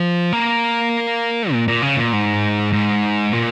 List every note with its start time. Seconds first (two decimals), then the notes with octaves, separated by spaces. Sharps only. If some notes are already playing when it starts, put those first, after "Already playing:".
Already playing: F3
0.33 A#3
1.52 A#2
1.68 A#2
1.82 C#3
1.97 A#2
2.13 G#2
2.73 G#2
3.33 A#2